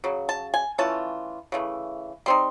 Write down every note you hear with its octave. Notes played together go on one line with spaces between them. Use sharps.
C#3 F#3
A5
G#5
E3 A3 C#4 F4 A5
C#3 E3 A3
G3 C4 D#4 C6